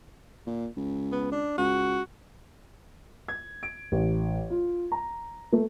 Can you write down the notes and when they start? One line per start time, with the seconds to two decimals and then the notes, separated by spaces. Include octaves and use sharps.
0.46 A#2
0.77 C#2
1.12 B3
1.32 D4
1.58 C#2 F#4
3.28 G#6
3.63 D7
3.92 A1
4.50 F4
4.92 A#5
5.53 A3